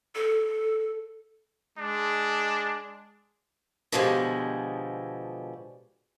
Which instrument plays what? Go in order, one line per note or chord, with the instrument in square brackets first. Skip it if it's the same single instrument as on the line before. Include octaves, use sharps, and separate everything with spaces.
[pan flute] A4
[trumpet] G#3 [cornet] D4
[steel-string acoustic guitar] B2 D3 F3 G3 G#3